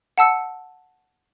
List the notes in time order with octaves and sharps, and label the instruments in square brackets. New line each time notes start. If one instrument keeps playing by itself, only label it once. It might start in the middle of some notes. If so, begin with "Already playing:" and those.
[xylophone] F#5 A5 E6 C#7